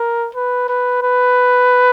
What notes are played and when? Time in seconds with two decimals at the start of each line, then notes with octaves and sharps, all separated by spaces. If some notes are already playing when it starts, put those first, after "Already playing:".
Already playing: A#4
0.35 B4
0.69 B4
1.02 B4